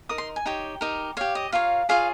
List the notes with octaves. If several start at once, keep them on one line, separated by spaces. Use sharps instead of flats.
D#4 A#4 D#6
C6
G#5
D#4 G4 C#5 G5
D#4 G4 A#4
G4 C#5 F5
D#5
F4 A#4 C#5 F5
F4 G#4 C#5 F5